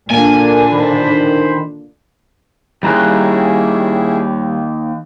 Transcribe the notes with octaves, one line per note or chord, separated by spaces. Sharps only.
A#2 D3 A#3 D4 G#5
D#3 C5 B5
D#2 G3 C#4 E4 G#4 A#5 F#6